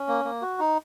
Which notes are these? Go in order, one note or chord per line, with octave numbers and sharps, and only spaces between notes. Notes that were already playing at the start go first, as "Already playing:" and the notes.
Already playing: C#4
A#3
A#3
F#4
D#4